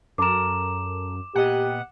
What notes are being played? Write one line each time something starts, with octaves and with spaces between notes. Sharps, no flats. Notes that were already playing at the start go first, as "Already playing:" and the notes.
F#2 A4 A#4 D6 E7
A#2 B3 G4 D#5 F#5